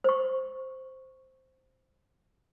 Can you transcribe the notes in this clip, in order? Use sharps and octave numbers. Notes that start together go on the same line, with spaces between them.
C5 C#6